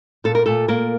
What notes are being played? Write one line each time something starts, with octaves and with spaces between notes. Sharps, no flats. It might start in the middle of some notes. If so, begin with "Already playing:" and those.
A#2 A4
A#4
A#2 A3 A4
A#2 A#3 A#4